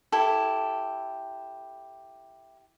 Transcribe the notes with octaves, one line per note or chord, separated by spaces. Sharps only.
E4 G4 A4